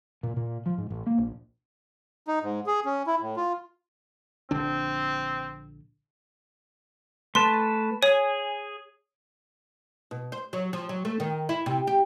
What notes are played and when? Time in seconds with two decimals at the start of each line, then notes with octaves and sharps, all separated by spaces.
0.23 A#2
0.36 A#2
0.66 F3
0.78 G#2
0.90 A1
1.06 A#3
1.18 A#1
2.28 D#4
2.42 G#2
2.67 G#4
2.85 C#4
3.07 E4
3.20 A2
3.37 F4
4.51 A#1 D3 C4 D4
7.35 A3 B4 A5 C6
8.03 G#4 C#5 G#5
10.11 B2
10.32 C5
10.53 F#3
10.73 F3
10.89 F#3
11.05 A3
11.20 D#3
11.49 E4
11.66 C3
11.87 G4